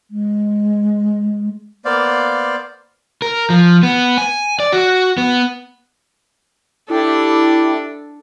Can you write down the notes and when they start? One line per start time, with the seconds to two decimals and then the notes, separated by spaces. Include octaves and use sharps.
0.10 G#3
1.85 A#3 B3 C5 D5 F5
3.22 A#4
3.50 F3
3.83 B3
4.18 G#5
4.60 D5
4.72 F#4
5.18 B3
6.90 D4 E4 G4 A4